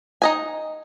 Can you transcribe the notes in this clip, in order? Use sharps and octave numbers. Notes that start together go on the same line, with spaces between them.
D#4 D#5 G#5